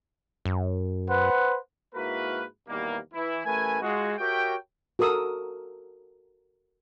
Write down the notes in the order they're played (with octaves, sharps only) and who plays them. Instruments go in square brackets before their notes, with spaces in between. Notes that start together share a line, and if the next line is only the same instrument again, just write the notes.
[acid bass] F#2
[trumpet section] B4 C5 F#5
[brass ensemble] G#2 A#3 E4 F#4 A#4 B4
D#2 B2 E3 G3 A#3
E3 E4
A1 A3 A#4 B4 G#5
G#3 F4 F#4
F#4 G4 A#4 C#5 E5 G5
[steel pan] F#4 A4 A#4 D#6 E6